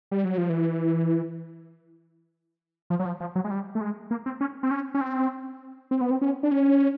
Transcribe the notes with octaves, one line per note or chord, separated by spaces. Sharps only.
G3
F#3
F3
E3
F3
F#3
F3
F3
F#3
G#3
G3
A3
G#3
A#3
C4
C#4
C4
C#4
C#4
C4
C4
B3
C4
C#4
D4
C#4